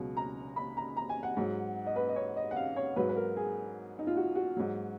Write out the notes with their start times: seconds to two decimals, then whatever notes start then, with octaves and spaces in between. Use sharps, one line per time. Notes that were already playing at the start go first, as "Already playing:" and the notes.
Already playing: C#2 B2 F#3
0.17 A#5
0.56 B5
0.77 A#5
0.97 A#5
1.09 G#5
1.23 F#5
1.37 G#2 F#3
1.86 D#5
1.96 B4
2.09 D#5
2.16 C#5
2.36 D#5
2.51 F#5
2.56 F5
2.76 C#5
2.96 G#2 F#3 B4
3.09 B4
3.16 A#4
3.37 G#4
3.99 D#4
4.07 F4
4.17 F#4
4.35 F#4
4.57 G#2 F#3